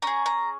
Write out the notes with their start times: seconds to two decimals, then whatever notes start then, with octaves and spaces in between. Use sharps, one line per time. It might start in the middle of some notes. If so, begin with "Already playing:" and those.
0.02 C#4 G#4 A#5
0.26 A#5